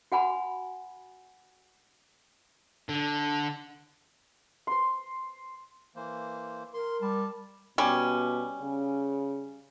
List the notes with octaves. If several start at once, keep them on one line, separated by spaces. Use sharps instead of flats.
F#4 F#5 G#5 B5
D3
C5 C6
E3 A#3 C5
A#4 C6
G3 A5
B2 G3 C#4
C#3